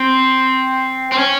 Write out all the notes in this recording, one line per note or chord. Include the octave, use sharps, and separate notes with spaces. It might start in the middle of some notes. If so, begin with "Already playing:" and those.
Already playing: C4
C4
C#4